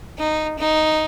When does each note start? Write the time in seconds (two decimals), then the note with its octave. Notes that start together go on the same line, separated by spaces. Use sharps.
0.19 D#4
0.59 D#4